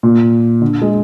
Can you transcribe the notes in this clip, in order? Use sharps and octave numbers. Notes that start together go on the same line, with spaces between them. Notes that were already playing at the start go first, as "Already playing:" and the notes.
A#2
D3
G#3